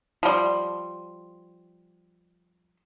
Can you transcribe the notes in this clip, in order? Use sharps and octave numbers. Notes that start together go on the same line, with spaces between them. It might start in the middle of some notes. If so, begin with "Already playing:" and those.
F3 G3